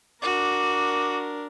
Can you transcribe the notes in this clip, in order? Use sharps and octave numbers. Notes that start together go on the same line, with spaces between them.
D4 F#4 A#4 D6